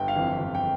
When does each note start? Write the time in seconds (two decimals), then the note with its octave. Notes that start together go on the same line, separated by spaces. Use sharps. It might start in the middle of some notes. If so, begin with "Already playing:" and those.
Already playing: G1 G5
0.08 F5
0.16 F2 E3
0.40 G1
0.55 G5